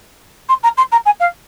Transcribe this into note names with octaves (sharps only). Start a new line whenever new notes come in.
C6
A#5
C6
A#5
G#5
F5